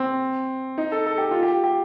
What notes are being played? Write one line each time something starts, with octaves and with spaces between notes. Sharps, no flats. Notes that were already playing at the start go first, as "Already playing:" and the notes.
Already playing: C4
D#4
A4
A4
G4
F4
G4
G4